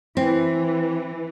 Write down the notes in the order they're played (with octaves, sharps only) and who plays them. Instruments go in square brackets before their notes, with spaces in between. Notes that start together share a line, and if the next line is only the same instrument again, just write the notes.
[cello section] E3 [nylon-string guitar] C4